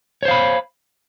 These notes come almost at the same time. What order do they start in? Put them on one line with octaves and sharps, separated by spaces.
C#5 C5 F5 B5